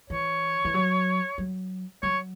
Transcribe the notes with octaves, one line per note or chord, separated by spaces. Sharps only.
E3 C#5
E3
F#3
F#3
F#3 C#5